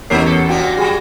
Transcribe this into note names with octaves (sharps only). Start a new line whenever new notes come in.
E2 G#3 C#4 D#4 G4 A#4 C7
A4
A#2 A#3 D4 F#4 F#5 G5
A#6
F#3 G3 G4 G#4 G#5